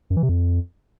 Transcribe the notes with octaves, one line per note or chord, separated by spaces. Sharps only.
F#2
E3
C3
F2